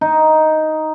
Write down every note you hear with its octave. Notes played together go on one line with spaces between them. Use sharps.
D#4